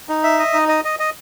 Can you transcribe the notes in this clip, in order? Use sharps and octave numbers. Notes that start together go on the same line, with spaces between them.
D#4
E5
D#5
D#4
D#5
D#5
D#5